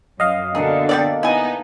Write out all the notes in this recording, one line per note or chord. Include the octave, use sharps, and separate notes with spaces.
F#2 D#5 F5
B2 D3 A#3 D4 G#4 A#4
G3 B3 D5
B3 D#4 E4 G#5